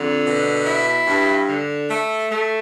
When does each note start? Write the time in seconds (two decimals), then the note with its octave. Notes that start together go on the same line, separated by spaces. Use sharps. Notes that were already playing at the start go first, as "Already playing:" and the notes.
Already playing: F2 D3
0.24 B2
0.65 E4
1.07 G2
1.48 D3
1.89 A3
2.31 A3